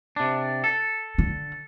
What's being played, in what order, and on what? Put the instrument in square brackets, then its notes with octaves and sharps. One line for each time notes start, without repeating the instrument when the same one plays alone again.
[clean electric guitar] C3 D4
A4
[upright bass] D3